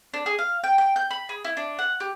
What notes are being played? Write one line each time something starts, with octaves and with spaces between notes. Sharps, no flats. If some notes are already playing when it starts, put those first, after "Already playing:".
D4
G#4
F5
G5
G5
G6
B5
G#4
E4
D4
F#5
G4